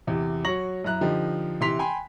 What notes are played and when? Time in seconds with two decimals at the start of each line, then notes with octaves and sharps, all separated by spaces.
0.07 E2 C3
0.44 F#3 F#4 C#5 C#6 A#6 F#7
0.84 F#2 E4 A#5 F#6
1.01 D3 F3 D#4 G4
1.61 C3 E3 C6 B6 F7
1.79 G5 G#5 B5 C6